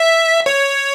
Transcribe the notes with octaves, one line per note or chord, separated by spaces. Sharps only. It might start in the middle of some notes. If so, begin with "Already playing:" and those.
Already playing: E5
C#5